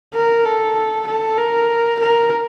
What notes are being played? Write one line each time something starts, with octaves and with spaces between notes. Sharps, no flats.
A#4
A4
A4
A#4
A#4